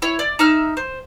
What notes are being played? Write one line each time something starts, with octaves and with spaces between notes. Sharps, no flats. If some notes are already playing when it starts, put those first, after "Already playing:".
E4 C#5
D5
D#4 E5 F6
C5